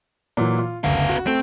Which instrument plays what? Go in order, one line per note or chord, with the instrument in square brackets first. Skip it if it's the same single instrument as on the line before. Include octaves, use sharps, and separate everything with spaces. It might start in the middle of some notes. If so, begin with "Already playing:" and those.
[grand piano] A#2 E3 F#3
F4
[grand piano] F#1 D2 [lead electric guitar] B3 F5
[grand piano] F#4
[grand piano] A3 [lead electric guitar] C4